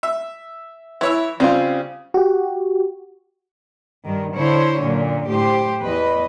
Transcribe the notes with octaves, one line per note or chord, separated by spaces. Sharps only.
E5
E3 E4 C#5 E5
C#3 G3 C4 F4
F#4 G4
G2 D#3
D3 E4 C5 C#5
F#2 A#2 D3
A2 G4 C5
E2 B4 D#5